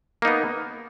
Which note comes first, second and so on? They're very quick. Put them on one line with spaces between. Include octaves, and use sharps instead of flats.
A#3 D#4 B3